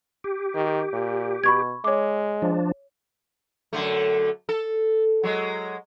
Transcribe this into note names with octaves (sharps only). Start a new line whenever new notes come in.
G4
D#3
A#2
B2 B5 C#6 G#6
G#3 C#5 D6
F3 D4
F#2 D3 A3
A4
F#3 G#3